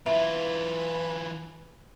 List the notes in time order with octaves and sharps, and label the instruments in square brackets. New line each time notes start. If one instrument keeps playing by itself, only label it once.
[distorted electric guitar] E3 F4 [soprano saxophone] B4 [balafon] E5